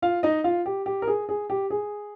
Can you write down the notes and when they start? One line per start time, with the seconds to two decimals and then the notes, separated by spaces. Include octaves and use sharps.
0.02 F4 F5
0.23 D#4 D#5
0.44 F4 F5
0.66 G4
0.86 G4
1.02 A#4
1.07 G#4
1.29 G#4
1.50 G4
1.70 G#4